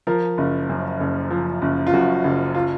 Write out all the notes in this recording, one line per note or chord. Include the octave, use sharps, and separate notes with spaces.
F3 A#4
F#1
F#2
F#1
F3
F#1
F4
F#2 F#4
F#1
F4